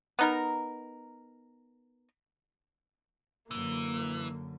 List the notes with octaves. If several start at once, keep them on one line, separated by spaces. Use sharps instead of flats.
B3 D#4 A#4
F#2 D3 E3 A#3